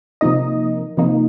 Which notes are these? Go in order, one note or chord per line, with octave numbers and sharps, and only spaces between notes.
C3 F3 A#3 D#4 D#5
C3 F3 A#3 D#4